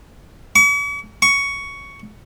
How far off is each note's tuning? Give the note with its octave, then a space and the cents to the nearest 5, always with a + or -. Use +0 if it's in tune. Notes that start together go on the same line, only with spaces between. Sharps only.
C#6 +45
C#6 +10